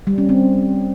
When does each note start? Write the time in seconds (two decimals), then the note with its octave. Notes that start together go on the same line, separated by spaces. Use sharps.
0.07 G3
0.18 C#4
0.29 C4